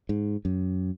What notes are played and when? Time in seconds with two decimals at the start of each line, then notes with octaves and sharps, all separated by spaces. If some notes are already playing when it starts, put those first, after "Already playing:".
0.09 G#2
0.45 F#2